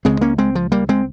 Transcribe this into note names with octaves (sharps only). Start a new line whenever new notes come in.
C#2 C#3 G#3 C4
A#3 C#4
G#3 C4
F3
G3 A#3
G#3 C4